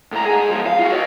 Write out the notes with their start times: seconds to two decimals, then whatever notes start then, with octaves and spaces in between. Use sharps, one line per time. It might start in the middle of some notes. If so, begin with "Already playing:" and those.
0.12 A2 A#5
0.26 G#2 G#4
0.50 G#2 F3
0.66 F5
0.79 F4 F#4
0.92 C#5 D#5